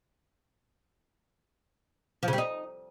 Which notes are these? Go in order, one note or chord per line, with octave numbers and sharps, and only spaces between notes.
F3
C#3
G3
D#4